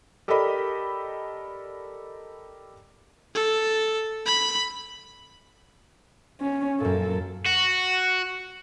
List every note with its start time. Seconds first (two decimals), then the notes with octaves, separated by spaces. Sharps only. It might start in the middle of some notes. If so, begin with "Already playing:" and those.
0.28 G4 A4 A#4 D5 D#5 B5
3.34 A4
4.26 B5
6.41 C#4
6.81 F#2 A#2 A4
7.46 F#4